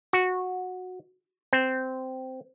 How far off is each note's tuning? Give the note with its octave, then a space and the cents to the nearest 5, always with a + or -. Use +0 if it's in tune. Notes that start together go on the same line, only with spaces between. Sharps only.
F#4 -10
C4 -10